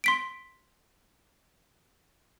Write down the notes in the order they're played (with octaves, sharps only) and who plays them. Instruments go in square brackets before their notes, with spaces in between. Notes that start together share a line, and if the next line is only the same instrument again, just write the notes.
[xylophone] C6 B6 D7